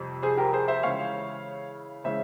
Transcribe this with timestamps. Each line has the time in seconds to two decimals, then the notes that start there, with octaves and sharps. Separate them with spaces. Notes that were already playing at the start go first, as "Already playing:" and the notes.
Already playing: F2 C3 G3
0.23 G#4 C5
0.37 G4 A#4
0.53 G#4 C5
0.68 C5 E5
0.83 C#3 E3 G#3 C#4 E4 C#5 F5
2.04 C#3 E3 G#3 C#4 C5 E5